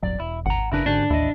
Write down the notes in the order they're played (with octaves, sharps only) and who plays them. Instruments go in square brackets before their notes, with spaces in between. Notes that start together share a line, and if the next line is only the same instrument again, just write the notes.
[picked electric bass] D#1 G#1 F#3 [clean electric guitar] D5
[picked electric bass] E1 [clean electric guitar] E4
[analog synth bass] G#1 [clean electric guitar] F#5 A#5
[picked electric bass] F#1 C#3 D4 [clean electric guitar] E4 A#4 B4
[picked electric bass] G#2 D3 [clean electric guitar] C#4 F#4 G4 [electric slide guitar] D4
[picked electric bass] A1 [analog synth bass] D#2 [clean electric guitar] E4 D#5